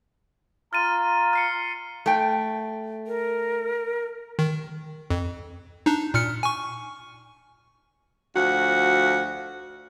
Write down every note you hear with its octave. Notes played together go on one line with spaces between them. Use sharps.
F4 A#5 F6 A6 D#7
F6 C7 C#7
A3 G5
A#4
D#3
F2
D4 D#4
A#2 F6 C#7
G#5 C#6
D2 F3 F#4